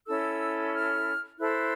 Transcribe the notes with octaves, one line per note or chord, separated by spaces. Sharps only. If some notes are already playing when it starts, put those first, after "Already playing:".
C#4 E4 A4 E6
F6
E4 A4 C5 F#6